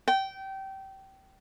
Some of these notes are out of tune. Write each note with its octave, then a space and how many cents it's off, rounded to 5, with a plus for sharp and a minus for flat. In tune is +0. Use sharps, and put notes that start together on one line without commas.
G5 -25